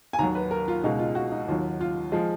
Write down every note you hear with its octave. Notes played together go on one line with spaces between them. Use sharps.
G#5
D#2 D#3 F#3 A#5
B4
A#4
F4
C#2 B2 G#3 D#4
F4
F#4
D#4
D#2 D#3 F#3 F4
F4
F3 G#3 F4